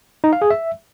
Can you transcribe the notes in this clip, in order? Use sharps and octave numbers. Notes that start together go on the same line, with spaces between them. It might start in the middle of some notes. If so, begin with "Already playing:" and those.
D#4
F5
G#4
E5